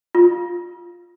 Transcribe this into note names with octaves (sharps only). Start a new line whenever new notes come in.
F4